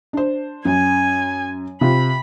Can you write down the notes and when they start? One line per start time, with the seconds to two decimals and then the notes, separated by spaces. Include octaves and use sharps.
0.13 D4 C5
0.65 F#2 G#5
1.81 C3 F4 B5